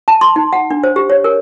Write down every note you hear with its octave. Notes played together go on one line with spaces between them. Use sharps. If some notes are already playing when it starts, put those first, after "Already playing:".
A5
C6
D#4
F#5
D4
C5
G4
C#5
A#4